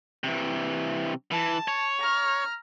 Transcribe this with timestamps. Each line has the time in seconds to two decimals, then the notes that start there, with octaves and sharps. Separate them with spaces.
0.24 C3 E3
1.31 E3 A5
1.68 C#5
1.99 A#5 F6